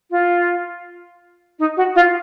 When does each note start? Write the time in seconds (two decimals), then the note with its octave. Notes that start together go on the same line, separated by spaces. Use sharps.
0.10 F4
1.58 D#4
1.76 F#4
1.95 F4